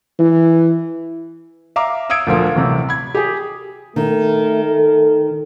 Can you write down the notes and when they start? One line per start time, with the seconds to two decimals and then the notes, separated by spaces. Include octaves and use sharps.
0.19 E3
1.76 E5 F5 A#5 D6
2.10 F5 D#6 E6 G#6 D7
2.27 D2 A#2 F3 A#3
2.55 A1 C3
2.89 B5 G#6
3.15 G4 G#4
3.96 D#3 A3
4.65 A4